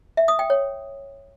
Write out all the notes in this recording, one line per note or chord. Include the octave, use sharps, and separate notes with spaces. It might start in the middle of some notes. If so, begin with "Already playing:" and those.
E5
D#6
G5
C#5